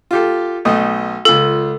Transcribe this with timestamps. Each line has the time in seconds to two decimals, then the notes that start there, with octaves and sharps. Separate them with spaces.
0.11 F4 G4 A4
0.65 B1 A3 D#5
1.25 C#2 F4 A4